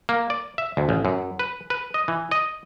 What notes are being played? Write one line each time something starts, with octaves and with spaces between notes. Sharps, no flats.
A#3
D5
E5
D2
A1
F#2
B4
B4
D#5
E3
D#5